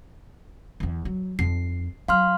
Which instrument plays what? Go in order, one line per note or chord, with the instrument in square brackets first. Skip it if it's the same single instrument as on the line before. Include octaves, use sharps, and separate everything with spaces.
[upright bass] E2 E3
F#3
[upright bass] F2 D#4 [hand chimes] C7
[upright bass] F#3 [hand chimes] F5 C6 F6